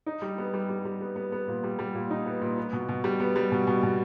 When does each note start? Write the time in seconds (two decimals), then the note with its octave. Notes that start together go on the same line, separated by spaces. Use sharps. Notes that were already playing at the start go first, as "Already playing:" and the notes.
0.06 D#4
0.22 G3
0.38 B3
0.54 G3
0.69 G3
0.85 G3
1.01 B3
1.16 B3
1.32 B3
1.48 A#2
1.64 G3
1.79 G3
1.95 A#2
2.10 D#4
2.26 B3
2.42 A#2
2.58 B3
2.73 B2
2.89 B2
3.04 G3
3.20 B3
3.36 G3
3.52 B2
3.67 B2
3.83 B2